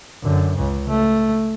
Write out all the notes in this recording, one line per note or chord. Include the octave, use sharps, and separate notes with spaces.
F#2 D3
C#2 C#3
A3